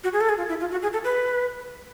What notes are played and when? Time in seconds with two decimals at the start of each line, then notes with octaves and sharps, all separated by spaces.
0.04 F#4
0.13 G#4
0.21 A4
0.29 G#4
0.38 F4
0.49 E4
0.60 F4
0.71 F#4
0.82 G#4
0.93 A4
1.04 B4